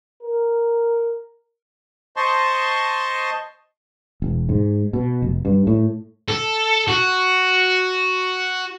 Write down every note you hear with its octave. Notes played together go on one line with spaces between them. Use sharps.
A#4
C5 D#5 A5 C6 C#6
E1
G#2
B2
F1
G2
A2
A4
F#4